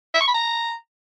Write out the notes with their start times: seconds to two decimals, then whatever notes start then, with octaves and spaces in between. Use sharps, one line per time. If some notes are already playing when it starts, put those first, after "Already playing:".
0.14 E5
0.21 C#6
0.28 B5
0.34 A#5